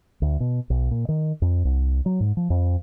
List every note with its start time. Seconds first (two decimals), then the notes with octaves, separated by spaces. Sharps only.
0.22 D2
0.40 B2
0.70 B1
0.91 A#2
1.09 D#3
1.42 F2
1.65 C2
2.06 F#3
2.20 G#2
2.37 F3
2.50 F2